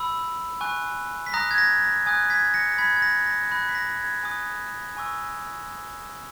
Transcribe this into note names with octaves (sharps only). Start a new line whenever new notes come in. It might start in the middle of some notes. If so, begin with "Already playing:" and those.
Already playing: B5 E6
G#5 C#6 F#6
B6
A#5 D#6 F#6 A#6
G#6
A#6
A#6
G#5 D#6 F#6 G#6
G#6 B6
A#6 C#7
A#6
B5 F#6 G#6 B6
G#6
A#6
A#6
B5 F#6 A#6
B6
A#6
G#6
G#5 D#6 F#6
G#5 C#6 E6